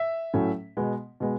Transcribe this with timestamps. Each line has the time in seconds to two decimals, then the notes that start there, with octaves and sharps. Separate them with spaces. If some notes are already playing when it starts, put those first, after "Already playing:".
Already playing: E5
0.34 A2 F#3 A3 C#4
0.77 B2 G#3 B3
1.20 B2 G#3 B3